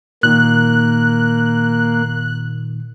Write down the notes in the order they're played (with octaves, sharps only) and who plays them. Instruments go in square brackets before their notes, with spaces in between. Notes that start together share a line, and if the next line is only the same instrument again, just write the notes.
[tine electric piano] A#2 D#3 [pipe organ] A#3 [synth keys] F#6